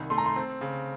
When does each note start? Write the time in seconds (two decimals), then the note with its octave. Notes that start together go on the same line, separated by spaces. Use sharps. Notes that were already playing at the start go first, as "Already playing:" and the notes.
Already playing: C2 D#3
0.10 A3 C6
0.18 A#5
0.26 C6
0.36 C4
0.61 C#3